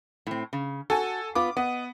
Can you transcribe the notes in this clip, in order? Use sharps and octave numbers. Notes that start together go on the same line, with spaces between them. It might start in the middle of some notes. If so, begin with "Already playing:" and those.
A2 C4
C#3
F#4 A4 G#5
B3 F4 B4 D6
B3 D#5